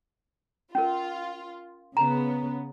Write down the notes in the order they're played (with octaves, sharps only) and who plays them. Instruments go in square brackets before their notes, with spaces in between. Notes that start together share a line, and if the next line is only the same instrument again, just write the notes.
[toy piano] C#4 A#4 [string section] F4
[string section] C#3 B3 [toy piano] A#5